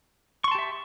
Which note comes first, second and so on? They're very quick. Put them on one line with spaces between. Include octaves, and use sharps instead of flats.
C#6 C6 A5 G4 E5